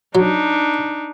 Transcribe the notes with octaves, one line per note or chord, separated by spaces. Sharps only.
F#3 D4 D#4